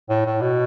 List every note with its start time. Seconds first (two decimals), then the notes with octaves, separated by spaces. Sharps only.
0.09 A2
0.26 A2
0.41 B2